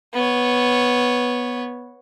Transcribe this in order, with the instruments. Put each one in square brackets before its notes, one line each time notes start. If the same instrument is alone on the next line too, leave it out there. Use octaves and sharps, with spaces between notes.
[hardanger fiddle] B3 C#5